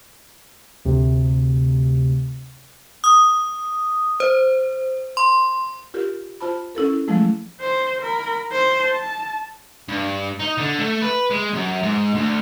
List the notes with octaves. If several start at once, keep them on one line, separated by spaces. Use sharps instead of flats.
D2 C3
D#6
C5
C6
F4 G4 A#4
F4 C5 A5 B5
C#4 E4 A4 A#4
F3 F#3 G#3 A3 E4 G#4
C5
A#4 B5
C5
A5
G2
D#4
D3
A3
B4
G#3
F#2
G#2
D2